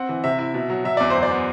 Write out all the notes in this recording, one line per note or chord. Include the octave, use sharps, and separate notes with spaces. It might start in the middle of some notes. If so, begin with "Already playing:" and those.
Already playing: C4 F#5
E3
C3 E5
E4
B2
F#3
F#3 E5
E2 D5
F#2 C5
D5
B3